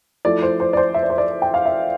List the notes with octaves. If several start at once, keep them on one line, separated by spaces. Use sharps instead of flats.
F3 A3 E4 D5
C5
C5
D5
C5
E5
D5
C5
D5
G5
F5
E5